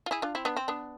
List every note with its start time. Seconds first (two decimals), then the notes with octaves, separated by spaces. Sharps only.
0.06 F4
0.11 E4 G#4
0.22 D4 F4
0.35 C4 E4
0.45 B3 D4
0.57 C4
0.68 B3 D4